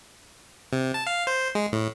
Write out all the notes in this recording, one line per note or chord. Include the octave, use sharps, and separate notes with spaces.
C3
A5
F5
C5
G#3
A2